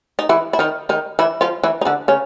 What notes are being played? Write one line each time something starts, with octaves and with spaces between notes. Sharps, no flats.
D#4
E3 E4
E4
D#3 D#4
D#3 D#4
E3 E4
F3 F4
E3 E4
D#4
D3 D4
C#3 C#4